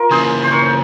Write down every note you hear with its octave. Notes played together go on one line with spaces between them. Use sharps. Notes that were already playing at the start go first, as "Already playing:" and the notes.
Already playing: F4 A#4
C#3 E3 A#3 E4 G#4 C5
C5
A#4 C#5